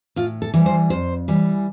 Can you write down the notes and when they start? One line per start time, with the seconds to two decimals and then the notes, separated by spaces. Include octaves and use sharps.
0.16 A2 F4
0.42 A4
0.54 E3 G3
0.66 C5
0.90 F2 C5
1.28 E3 G3